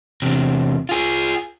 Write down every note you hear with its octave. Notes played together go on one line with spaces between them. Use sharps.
E2 C3
F4 G#4